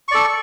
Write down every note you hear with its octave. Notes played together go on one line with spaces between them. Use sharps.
A4 D5 C#6